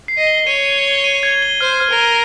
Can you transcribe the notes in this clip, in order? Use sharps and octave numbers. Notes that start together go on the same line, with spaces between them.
C7
D#5
G7
C#5 D#7
D#7
G7
D#7
G#6
G7
C5 F6
F6
A#4
D#7